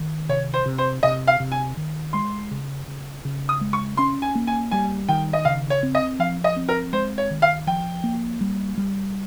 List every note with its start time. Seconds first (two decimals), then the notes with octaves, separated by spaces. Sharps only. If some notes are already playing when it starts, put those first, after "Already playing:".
Already playing: D#3
0.29 C3 C#5
0.54 C5
0.66 C3
0.78 C5
1.03 C3 D#5
1.27 F5
1.40 C3
1.52 G#5
1.77 D#3
2.13 G#3 C6
2.51 C#3
2.88 C#3
3.25 C#3
3.49 D#6
3.61 G#3
3.73 C#6
3.97 C#4 C6
4.22 G#5
4.35 A#3
4.47 G#5
4.71 G3 G#5
5.09 D#3 G5
5.33 D#5
5.45 C#3 F5
5.70 C#5
5.83 C4
5.95 D#5
6.19 F3 F5
6.44 D#5
6.56 C4
6.69 A#4
6.93 G#3 C5
7.18 C#5
7.31 D#3
7.42 F5
7.67 F3 G5
8.04 A#3
8.41 G3
8.77 G3